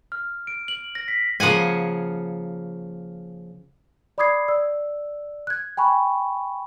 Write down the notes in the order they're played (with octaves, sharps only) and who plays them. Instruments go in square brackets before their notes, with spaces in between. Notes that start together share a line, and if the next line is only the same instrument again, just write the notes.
[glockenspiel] F6
D7
F#7
A#6
B6
[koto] C#3 F3 A#3 F#5 G#5
[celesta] D5 B5 D6 D#6 G#6 C7
D5 E6
F#6 G#6
G5 G#5 B5 C#6